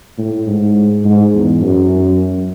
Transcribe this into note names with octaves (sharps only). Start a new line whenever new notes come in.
A2
G#2
G#2
E2
F#2